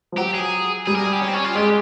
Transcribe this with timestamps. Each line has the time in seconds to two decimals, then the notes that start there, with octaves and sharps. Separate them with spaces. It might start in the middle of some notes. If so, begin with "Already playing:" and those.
0.12 F3
0.17 F#3 G4
0.35 G#4
0.87 G3 G#4
0.95 A#4
1.04 G#4
1.12 G4
1.21 C#4
1.28 C4
1.33 C#4
1.44 F4
1.55 G#3 G4